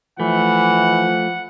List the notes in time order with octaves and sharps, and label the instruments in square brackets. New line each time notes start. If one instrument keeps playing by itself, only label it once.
[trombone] E3 [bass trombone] F3 [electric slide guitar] A3 [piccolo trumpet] F#5